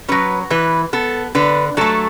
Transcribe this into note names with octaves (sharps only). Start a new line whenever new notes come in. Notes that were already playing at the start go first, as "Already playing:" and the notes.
F#3 C#4 B4
E3 B4
B3 A4
D3 B4
F#3 A3 A4